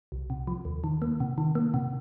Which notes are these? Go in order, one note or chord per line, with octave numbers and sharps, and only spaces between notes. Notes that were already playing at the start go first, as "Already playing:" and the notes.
C2
C3
F3
D#2
D#3
A#3
C3
D#3
A#3
C3